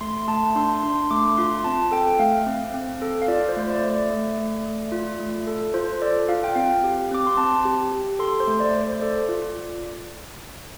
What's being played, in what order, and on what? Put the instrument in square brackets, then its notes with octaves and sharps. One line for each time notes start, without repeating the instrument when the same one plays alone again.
[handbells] A3 C6
A3 A5
D4 C6
D4 C6
A3 D6
F4 C6
C4 A5
A4 G5
A3 F5
C4
C4
A4
F5
F4 D5
C5
A3
D5
A3
D5
A3
A3
A3
F4
A3
A4
F4 C5
A4 D5
F4 F5
G5
C4 F5
G4
C4 D6
C6
C4 A5
G4
G4
A4 C6
C5
A3
D5
A3
C5
A4 D5
F4